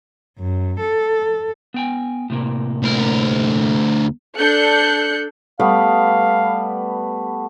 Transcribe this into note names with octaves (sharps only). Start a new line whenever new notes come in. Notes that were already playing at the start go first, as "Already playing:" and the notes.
F#2
A4
B3 G5 G#5
A2 C3 A#3
D2 A#4
D4 A4 F#6 G6 C#7
G3 A3 B3 F5